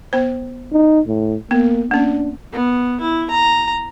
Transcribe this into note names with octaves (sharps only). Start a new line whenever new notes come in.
B3 C5
D#4
A2
A#3 B3
A#3 C#4 D4
B3
E4
A#5